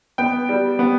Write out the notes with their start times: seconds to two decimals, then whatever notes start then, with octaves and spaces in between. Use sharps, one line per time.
0.18 B3 G5
0.49 G3
0.79 B3